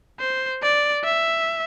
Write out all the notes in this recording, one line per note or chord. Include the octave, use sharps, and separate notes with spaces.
C5
D5
E5